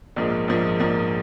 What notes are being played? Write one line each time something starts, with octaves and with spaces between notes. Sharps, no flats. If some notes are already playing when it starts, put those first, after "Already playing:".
A#1 G#2 F3 A#3
A#1 G#2 F3 A#3
A#1 G#2 F3 A#3